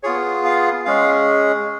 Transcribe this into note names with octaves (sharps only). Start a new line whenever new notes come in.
B3 F4 G#4 C#5
F5
G#3 C#4 G#4 F5